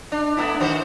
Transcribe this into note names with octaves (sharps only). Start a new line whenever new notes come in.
D4
A3 B3 E4
D#3 F#4 C5